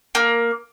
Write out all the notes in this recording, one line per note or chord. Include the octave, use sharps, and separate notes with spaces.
A#3